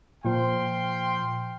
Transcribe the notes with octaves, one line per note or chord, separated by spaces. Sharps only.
A#2 F3 F5 G5 C6